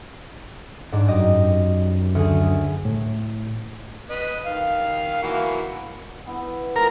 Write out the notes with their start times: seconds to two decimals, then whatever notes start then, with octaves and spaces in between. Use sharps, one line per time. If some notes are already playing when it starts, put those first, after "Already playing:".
0.92 G#2 D4
1.08 F#2 G4 D#5
2.15 D2 G#4
2.85 A2
4.10 B4 D#5
4.46 D#3 F5
5.22 E3 A#3 F#4
6.25 E3 B3 E4
6.76 G#3 F4 A#4